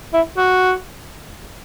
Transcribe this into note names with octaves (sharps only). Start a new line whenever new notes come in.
E4
F#4